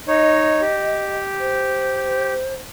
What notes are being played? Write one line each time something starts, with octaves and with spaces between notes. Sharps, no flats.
D#4 C#5 D#5
G4
C5